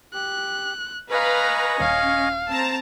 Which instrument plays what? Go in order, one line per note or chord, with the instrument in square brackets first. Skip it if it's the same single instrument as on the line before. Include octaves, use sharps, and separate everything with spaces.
[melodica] G4 [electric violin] F#6
[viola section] B4 A#5 [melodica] D#5 G#5 C#6 [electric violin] F5
[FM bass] D#1 [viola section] C#4 [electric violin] F5
[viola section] C4 A5 A#5